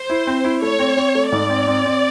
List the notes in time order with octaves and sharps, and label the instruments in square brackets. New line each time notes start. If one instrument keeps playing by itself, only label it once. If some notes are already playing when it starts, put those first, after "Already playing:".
Already playing: [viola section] C5
[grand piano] E4
C4
E4
[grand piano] A3 [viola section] C#5
[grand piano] C4
C4
A3
[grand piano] G#2 [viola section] D5
[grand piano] C4
C4
C4